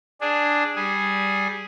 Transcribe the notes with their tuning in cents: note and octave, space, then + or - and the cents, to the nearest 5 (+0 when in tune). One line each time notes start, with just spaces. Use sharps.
D4 +0 G#4 +0
G3 +0 G#4 +0